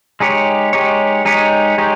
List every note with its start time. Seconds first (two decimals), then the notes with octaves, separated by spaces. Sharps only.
0.20 G#3 D#4 G4 C#5
0.73 G#3 D#4 G4 C#5
1.25 G#3 D#4 G4 C#5
1.78 G#3 D#4 G4 C#5